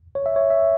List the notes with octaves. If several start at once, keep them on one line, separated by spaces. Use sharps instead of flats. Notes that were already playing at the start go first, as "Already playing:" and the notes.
C#5
E5
C#5
E5